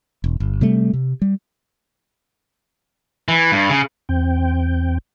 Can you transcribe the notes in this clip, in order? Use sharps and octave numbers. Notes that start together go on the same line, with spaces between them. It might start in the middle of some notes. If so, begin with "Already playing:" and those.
E1
G1
C3 G3 A3
C3
G3
E3
G2
C#3
E2 C4 G5